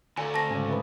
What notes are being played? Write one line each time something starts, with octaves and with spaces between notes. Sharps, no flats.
D2 A3 D5 F5 G#5 A#5
C4 A5 A#6
G#2 C#3 D5 F5 G#5
D#4 B4 E5